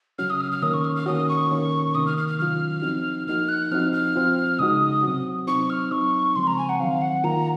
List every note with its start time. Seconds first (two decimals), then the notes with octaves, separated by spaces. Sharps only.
0.18 C#3 F#3 C#4 F#4 F6
0.30 D#6
0.40 F6
0.51 F6
0.62 D#3 A#3 C#4 D#6
0.73 C#6
0.84 F6
0.96 F6
1.06 D#3 A#3 C#4 F#4 D#6
1.29 C#6
1.51 D#3 A#3 C#4
1.94 C3 D#3 A#3 D#6
2.06 F6
2.17 F6
2.28 F6
2.39 D#3 F#3 C#4 F4 F6
2.82 F3 C4 D#4 F#4
3.27 F3 A#3 D#4 F#4 F6
3.48 F#6
3.71 F3 C4 D#4 F#4 F6
3.92 F6
4.15 F3 C4 F4
4.59 C#3 G#3 D#4 F#4 D#6
5.03 C3 F#3 C4 F#4
5.47 F#3 C4 D#4 C#6
5.69 F6
5.91 F#3 C4 D#4 C#6
6.35 C#3 F3 G#3 C4 C6
6.47 A#5
6.58 G#5
6.69 F#5
6.80 D#3 F#3 C4 F5
7.01 F#5
7.24 D#3 A#3 F4 A#5